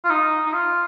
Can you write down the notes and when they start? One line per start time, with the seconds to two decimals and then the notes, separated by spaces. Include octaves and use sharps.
0.05 F4
0.10 D#4
0.46 D#4
0.53 F4